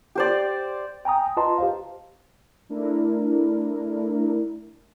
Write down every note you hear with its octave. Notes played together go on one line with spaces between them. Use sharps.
G4 C5 D5
G5 G#5 A#5 D#6
F4 B4 D#5 A5 A#5 C6
G4 C5 F5
A3 D4 E4 A#4